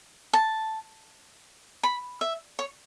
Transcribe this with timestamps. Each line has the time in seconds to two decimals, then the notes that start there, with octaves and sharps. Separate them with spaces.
0.33 A5
1.83 B5
2.21 E5
2.59 C#5